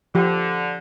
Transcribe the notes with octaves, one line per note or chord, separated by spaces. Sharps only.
D3 F3 G4